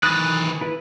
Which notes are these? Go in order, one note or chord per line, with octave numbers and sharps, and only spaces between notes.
D#3 E3 B4 D#6 F#6 A6
E4 B4